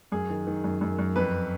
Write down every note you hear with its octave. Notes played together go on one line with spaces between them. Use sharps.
F#2 G#4
D#3
D#3
F#2
F#2
F#2
F2 B4